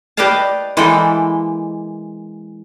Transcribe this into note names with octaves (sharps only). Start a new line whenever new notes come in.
G4 B4 D5 D#5 F5 A5
E3 G#3 A#3 A4 G5 B5